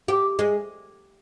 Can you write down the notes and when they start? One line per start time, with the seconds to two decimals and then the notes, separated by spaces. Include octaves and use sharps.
0.08 G4
0.39 G#3